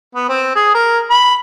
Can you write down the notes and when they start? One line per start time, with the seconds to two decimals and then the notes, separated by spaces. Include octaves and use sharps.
0.15 B3
0.29 C4
0.56 G#4
0.74 A#4
1.11 B5